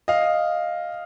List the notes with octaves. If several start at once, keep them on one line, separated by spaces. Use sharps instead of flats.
D#5 F5